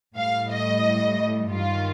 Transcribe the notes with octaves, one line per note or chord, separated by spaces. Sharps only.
A2 G3 F5
D#5
G2 D#3 G3 F4